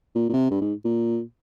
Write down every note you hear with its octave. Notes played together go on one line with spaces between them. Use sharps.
A#2
A#2
C3
G2
G#2
A#2